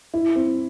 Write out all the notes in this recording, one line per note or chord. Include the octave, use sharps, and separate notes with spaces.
E4
C4